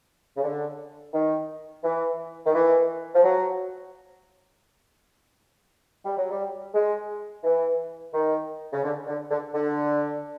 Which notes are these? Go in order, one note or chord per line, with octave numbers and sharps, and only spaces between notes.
C#3
D3
D#3
E3
D#3
E3
F3
F#3
G3
F#3
G3
G#3
E3
D#3
C#3
D3
D3
D3
D3